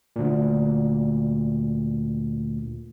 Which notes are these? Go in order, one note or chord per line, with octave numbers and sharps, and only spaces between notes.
D2 A#2